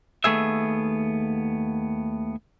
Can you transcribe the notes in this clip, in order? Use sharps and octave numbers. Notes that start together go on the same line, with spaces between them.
D#2 A3 B3 G#4 E5